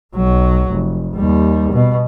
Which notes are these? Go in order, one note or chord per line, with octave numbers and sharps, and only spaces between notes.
B1 F#3
F1
D#2 G3
B2